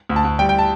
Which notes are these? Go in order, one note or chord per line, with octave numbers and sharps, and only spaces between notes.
D2
A5
D2
G3 G5
G5
A5